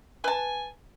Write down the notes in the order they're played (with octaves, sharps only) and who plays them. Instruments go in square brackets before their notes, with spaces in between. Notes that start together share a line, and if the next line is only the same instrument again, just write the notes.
[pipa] B4 A5 [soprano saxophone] G#5